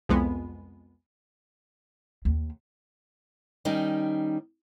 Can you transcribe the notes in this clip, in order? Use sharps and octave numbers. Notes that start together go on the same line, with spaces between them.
C2 F2 G#3 B3
D#2
D#3 G3 C#4 D#4